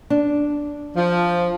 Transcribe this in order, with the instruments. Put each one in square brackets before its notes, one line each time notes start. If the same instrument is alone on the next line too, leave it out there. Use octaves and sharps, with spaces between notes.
[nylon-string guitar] D4
[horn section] F3